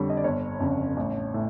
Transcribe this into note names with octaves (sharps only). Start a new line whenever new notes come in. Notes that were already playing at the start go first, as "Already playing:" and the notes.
Already playing: F2 D3 G3 C#5
D#5
D5
G1 C#5
F2 C#3
A1
A2